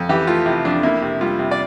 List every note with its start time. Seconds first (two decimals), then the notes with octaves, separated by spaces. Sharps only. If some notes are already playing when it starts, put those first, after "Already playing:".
Already playing: F2
0.09 E3 G4
0.27 A3 F4
0.46 C3 E4
0.65 F2 D4
0.83 A#3 E4
1.02 C3
1.21 G3 F4
1.39 C3
1.51 D5